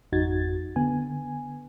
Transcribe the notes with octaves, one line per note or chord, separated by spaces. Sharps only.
G#1 F2 D#4 F#4 G#6 A6
D3 B3 G#5